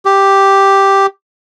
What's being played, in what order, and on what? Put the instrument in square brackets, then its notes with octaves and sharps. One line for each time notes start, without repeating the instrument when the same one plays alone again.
[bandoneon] G4